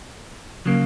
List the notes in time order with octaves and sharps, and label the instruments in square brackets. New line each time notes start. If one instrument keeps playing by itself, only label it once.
[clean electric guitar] C#3 F#3 A#3